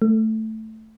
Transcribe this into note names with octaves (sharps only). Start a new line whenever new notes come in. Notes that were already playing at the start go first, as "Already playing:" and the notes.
A3